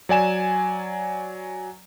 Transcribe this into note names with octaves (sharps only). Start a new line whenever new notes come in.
F#3 D5 G#5 E7